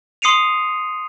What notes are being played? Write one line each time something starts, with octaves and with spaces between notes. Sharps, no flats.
C6 D#6 C7 C#7 D#7 F7